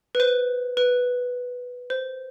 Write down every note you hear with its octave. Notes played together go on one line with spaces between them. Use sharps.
B4
C5
B4
C5